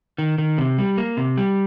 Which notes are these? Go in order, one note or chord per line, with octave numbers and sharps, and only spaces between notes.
D#3
D#3
C3
G3
A#3
C3
G3